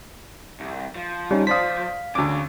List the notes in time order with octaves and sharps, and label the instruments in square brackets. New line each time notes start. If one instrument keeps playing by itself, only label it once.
[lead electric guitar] C2
F3
[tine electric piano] G3 C#4 D#4
[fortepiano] C5 D5 D#6 [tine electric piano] F5 B6
[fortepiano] D2 D6 [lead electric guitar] C#3